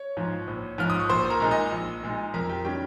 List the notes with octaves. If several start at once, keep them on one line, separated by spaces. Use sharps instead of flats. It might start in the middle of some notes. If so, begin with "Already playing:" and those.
Already playing: C#5 C#6
G#2 F3
A#1
G#2 F3 F6
D#6
C#6
A#1 C5 C6
A#4 A#5
A#2 G#3 D#4
D#5
A#1
A#2 G#3 D#4
F2 A#4 A#5
G4 G5
D#3 G3 C#4 G4 G5